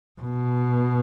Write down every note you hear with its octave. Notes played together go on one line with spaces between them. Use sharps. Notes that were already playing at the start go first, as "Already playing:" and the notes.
B2